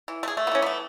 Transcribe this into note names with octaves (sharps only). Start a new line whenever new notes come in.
E3
A3
G#4
A3
B3
E3 C#4
A3 B3